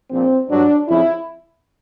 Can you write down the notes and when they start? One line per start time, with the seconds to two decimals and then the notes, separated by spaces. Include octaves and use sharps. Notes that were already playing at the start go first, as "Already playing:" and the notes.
0.11 A#1 A#2 F3 C4
0.49 G2 D3 F#3 D4
0.88 F2 C#3 E4